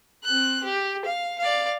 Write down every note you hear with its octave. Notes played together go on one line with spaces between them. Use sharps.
C4 F#6
G4
F5
D5 F5